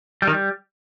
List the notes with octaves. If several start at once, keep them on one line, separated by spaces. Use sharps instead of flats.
G3
D#3
G3